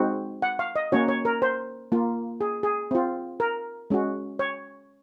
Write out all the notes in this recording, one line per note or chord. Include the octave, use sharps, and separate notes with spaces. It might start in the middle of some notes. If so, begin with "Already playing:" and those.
Already playing: G#3 C4 D#4 F#4
F#5
F5
D#5
A#3 C#4 F#4 C#5
C#5
A#4
C5
A#3 F4
G#4
G#4
C4 F4
A#4
G#3 C#4 F#4
C#5